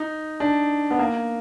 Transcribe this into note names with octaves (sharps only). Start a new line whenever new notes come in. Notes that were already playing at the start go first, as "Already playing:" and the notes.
Already playing: D#4
D4
B3
A#3